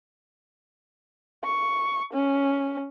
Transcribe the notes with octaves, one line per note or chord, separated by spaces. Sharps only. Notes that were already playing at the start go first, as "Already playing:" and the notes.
C#6
C#4